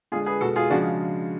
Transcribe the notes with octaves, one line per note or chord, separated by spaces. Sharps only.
D3 G#3 F4 G#4
G#4 B4
B2 G#3 F#4 A4
F4 G#4
C#3 F3 G#3 D4 F#4